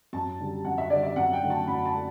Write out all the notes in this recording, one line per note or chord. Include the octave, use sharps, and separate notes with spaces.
F#2 A5
D3 G3
F#2 F#5
E5
D3 G3 D5
E5
F#2 F#5
G5
D3 F#3 A3
A5
F#2 B5
A5
A3